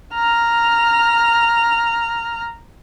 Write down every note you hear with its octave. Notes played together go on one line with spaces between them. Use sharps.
A#5 F6